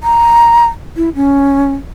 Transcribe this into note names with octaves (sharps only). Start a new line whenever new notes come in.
A#5
E4
C#4